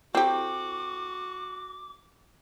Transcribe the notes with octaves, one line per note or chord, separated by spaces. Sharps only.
C4 E4 F#4 G4 A4 G5 D6